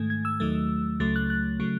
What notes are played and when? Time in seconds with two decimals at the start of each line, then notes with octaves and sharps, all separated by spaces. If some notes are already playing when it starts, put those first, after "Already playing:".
Already playing: G#2 D#3 A3 G#6
0.10 G#6
0.25 E6
0.40 D#2 D#3 F#3 A3
1.00 C#2 C#3 F#3 A3 A6
1.16 F#6
1.30 F#6
1.60 C#3 F#3 A3